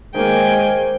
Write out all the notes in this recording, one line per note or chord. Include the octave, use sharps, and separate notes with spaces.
D#3 G#3 A#3 C5 G5 G#5